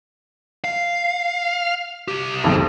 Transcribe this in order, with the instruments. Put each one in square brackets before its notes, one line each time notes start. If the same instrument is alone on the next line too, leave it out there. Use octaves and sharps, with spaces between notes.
[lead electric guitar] F5
C2 G4
[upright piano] B1 F2 G#2